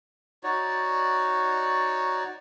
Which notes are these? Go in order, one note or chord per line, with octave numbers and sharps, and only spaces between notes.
D#4 F#4 C#5 D5